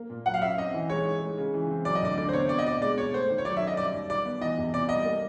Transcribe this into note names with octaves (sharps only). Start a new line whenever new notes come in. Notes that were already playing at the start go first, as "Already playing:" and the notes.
Already playing: A#3
A#2
F#3 F#5
F5
C#4 E5
C4 D#5
E3
G#3 C#5
D#4
G#3
C#3
E3
C4
F#3 D5
D#5
D2 D5
D3 D5
C5
B3 C#5
C4 D5
D#5
B2 D5
G#3 D5
B2 C#5
A3 C5
D#3
C#5
F#3 D5
E5
C#4
D#5
G3 D5
D#2
D#3 D5
B3
E3 D#5
E2
C3 D5
G3 D#5
A#3